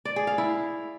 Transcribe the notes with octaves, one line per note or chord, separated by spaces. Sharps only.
D5
G#4
F5
E4